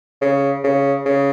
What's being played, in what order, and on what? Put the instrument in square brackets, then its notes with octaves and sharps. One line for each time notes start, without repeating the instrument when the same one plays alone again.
[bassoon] C#3
C#3
C#3